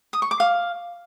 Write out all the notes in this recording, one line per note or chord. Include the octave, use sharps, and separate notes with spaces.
D#6
C#6
D6
F5